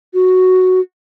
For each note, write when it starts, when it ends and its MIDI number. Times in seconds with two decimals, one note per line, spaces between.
0.14 0.80 66